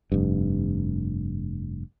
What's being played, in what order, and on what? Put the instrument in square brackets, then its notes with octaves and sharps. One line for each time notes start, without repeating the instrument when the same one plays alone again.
[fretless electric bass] F1 G2